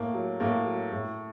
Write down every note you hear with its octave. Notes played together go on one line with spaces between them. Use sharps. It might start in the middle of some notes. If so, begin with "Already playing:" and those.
Already playing: A2 A#3
F#3
A2 A#3
F#3
A2